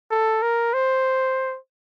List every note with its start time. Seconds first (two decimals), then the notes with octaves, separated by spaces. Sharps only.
0.11 A4
0.42 A#4
0.73 C5